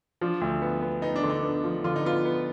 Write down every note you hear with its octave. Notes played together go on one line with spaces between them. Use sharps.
F3 D4
D2
B3
B3
B3 D#4
D4
D3
D#4
B3
F3
D3 F4
D#4
B3 F4
B3